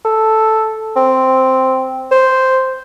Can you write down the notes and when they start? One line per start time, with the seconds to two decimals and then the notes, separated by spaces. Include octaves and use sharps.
0.05 A4
0.96 C4
2.12 C5